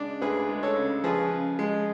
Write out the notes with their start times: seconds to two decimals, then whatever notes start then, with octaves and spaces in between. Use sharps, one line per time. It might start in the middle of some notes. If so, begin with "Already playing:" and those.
Already playing: C#3 G#3 D4
0.21 D2 G#4 B4
0.49 G#3
0.63 A4 C#5
0.76 C#3
1.04 F3 G#4 B4
1.31 C#3
1.59 G#3